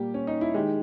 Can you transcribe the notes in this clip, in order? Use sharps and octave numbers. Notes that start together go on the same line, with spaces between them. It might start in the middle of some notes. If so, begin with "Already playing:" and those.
Already playing: A#2 G3 A#3 G4
C#4
D#4
E4
D#3 G#3 G4